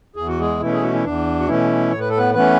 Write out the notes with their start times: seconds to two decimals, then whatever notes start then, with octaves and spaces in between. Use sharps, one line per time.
0.16 E2 G#4
0.28 F#4
0.39 G#3 G#4
0.60 B2 E3 A3 C#4 E4
0.72 G#4
0.83 F#4
0.94 E4
1.04 E2 D4
1.40 F#4
1.47 B2 E3 A3 C#4 E4
1.91 A2 C#5
2.00 B4
2.10 A4
2.17 B3 B4
2.34 E3 A3 B3 C#4 B4